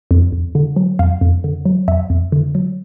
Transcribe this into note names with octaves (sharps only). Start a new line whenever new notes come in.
F2
F2
D3
F#3
F2 F5
F2
D3
F#3
F2 E5
F2
D3
F#3